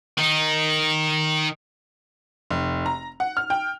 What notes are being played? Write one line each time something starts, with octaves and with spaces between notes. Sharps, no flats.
D#3 D#4
F1
A#5
F#5
F6
G5